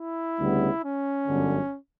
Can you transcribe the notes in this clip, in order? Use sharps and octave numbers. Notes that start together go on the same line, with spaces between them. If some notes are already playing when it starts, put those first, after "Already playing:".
Already playing: E4
D2 C#3 G3 B3
C#4
G1 F#2 D3